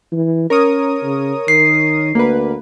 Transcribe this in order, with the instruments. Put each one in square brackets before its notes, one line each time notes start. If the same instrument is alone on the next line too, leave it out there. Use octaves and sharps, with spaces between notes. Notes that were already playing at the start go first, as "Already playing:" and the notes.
[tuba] E3
[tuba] C#4 [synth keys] A#4 C#5 D#6
[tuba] C#3
[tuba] D#3 [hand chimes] C7
[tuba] D2 [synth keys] A#3 B4